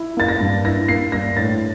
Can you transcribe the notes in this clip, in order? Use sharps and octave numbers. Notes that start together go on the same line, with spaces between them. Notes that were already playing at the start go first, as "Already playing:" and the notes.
Already playing: E4
A#3 A6
A#6
G2
E4 A#6
A#3 C7
G2 A#6
A2 A6